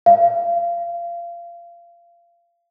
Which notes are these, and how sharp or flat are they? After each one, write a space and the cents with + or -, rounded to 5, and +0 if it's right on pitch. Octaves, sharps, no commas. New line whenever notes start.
F5 -25